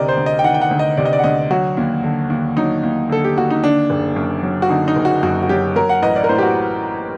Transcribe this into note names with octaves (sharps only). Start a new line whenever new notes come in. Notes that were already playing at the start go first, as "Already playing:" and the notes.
Already playing: D2 C3 A#4 D5 D#5
C5
D2
D#5
G5
D#3 F#5
G5
F#5
D2
D#5
C3 D5
D#5
D5
F#5
D2 D#5
F#3 F#4
D#2
D3
D#2
F#3 D#4
D#2
D3 A4
G4
D#2 F#4
D#4
D3 D4
F#1
F#2
F#3
F#4
D3 D#4
D#4
F#1
F#4
F#2 F#4
F#4
F#3 G4
F#3 A#4
F#5
A1 D#5
D5
A#4
A2 C5
G4
F#4